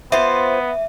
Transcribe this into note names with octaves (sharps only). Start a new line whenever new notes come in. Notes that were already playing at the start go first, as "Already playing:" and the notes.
B3 F4 C5 E5